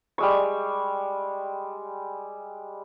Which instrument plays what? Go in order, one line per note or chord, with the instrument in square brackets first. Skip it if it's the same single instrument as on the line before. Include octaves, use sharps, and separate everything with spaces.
[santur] G3 G#3 C#6